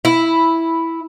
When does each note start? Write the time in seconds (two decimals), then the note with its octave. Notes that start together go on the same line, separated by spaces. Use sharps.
0.05 E4